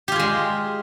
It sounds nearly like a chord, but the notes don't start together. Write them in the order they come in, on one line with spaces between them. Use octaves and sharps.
G4 F4 G#4 G#3